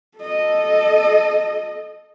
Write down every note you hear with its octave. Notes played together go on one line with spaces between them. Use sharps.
A4 D#5